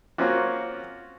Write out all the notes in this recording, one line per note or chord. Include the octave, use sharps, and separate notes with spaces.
A#3 C4 C#4 F4 F#4